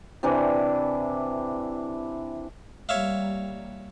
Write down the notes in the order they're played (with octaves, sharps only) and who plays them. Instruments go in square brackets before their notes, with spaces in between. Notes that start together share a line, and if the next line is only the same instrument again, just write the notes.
[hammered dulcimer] C3 E3 D4 C5
[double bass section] G3 A#3 [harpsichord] C#5 E5 F5